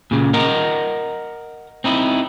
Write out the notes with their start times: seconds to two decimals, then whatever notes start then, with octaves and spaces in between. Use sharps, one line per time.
0.11 A#2 C#3
0.34 A#4 D#5 F#5 A#5
1.84 C4 D#4 E4